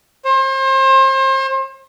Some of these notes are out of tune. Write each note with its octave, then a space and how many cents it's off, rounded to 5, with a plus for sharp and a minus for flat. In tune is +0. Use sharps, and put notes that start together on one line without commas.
C5 +35